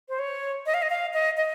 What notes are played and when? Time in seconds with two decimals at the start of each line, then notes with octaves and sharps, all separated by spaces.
0.09 C5
0.19 C#5
0.66 D#5
0.74 F5
0.82 D#5
0.90 F5
1.14 D#5
1.37 D#5